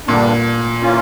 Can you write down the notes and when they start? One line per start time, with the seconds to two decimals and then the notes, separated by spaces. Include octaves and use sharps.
0.07 G2 A#2 D3 G3 D4
0.82 E3 A#3 C#4 F4